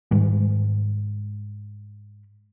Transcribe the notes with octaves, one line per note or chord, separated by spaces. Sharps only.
G#2 D#3 G3 G#3